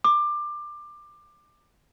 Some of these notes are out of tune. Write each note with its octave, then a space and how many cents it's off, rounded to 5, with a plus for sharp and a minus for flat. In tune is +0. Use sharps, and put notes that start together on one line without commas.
D6 +20